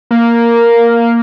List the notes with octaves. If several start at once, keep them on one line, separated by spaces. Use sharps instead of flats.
A#3